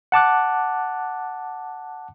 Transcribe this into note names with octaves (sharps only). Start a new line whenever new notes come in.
F#5 A5 D6 F#6